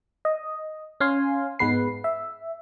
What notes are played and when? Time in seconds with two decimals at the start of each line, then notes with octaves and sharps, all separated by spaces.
0.25 D#5
1.00 C#4 F5 G#5 C6
1.59 G#2 G#3 B3 B4 C7
2.04 E5